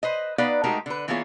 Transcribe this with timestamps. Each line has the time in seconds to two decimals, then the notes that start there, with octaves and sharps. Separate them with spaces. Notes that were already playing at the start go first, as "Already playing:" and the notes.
0.03 B4 C5 D#5
0.38 B3 D#4 B4 D5 F5
0.64 G#3 A3 D#4 F#4 G4 A#4
0.86 D3 B4
1.08 E3 A#3 B3 F4 G#4 C#5